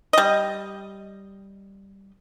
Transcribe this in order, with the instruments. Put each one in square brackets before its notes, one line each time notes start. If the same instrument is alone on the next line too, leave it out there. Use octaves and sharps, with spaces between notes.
[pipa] G3 D#5